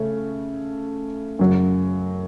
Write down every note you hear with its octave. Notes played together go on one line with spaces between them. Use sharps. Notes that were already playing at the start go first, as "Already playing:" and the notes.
Already playing: C#3 A3 C#4
F#2 C#3 F#3